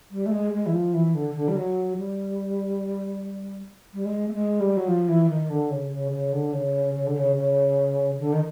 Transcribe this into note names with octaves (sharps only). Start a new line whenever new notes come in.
G3
A3
G#3
G#3
E3
F3
E3
D3
D3
G3
F#3
G3
G3
G#3
A3
G#3
G3
F#3
F3
E3
D#3
D3
C#3
C#3
C#3
D3
C#3
C#3
D3
C#3
C#3
D3
D#3